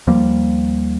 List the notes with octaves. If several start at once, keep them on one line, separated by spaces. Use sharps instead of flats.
D#2 F3 G3 A#3